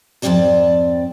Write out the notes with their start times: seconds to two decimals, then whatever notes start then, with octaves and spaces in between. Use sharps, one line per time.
0.22 F2 G#2 D#3 C4 D5 A5